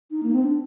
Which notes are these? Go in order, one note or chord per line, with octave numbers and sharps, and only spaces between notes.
D#4
A#3
C4
D4